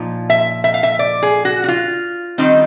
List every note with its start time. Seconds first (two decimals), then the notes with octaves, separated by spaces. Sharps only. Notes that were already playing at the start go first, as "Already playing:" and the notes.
Already playing: A#2 F3 D#4
0.30 E5
0.64 E5
0.74 F5
0.83 E5
0.99 D5
1.23 G#4
1.45 F#4
1.64 F#4
1.68 F4
2.38 D#3 G3 C4 D#4